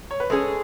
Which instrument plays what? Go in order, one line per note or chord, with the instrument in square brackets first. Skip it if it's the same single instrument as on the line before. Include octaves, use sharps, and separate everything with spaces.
[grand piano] C#5
B4
[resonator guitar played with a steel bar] G#3 C#4 G#4 [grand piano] A4